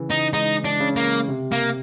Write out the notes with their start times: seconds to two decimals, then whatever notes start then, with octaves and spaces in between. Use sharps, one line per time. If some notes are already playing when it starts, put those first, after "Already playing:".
Already playing: C#3 E3
0.10 D#4
0.33 G#3 D#4
0.65 D4
0.80 C#3
0.96 A#3
1.28 C3
1.52 A#3